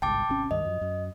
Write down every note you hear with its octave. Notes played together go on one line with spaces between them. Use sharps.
G1 C2 G#2 G5 A5 D6
G#1 C3 C#4
C#2 G2 D#3 D#5
F#2 F3
F#2